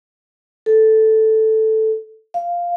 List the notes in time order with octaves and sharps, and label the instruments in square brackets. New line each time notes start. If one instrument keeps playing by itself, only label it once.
[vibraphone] A4
F5